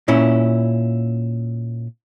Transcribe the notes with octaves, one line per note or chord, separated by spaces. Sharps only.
A#2 C#4 E4